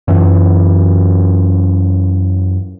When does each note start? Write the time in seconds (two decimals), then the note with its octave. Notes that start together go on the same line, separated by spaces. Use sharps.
0.08 F#2 E3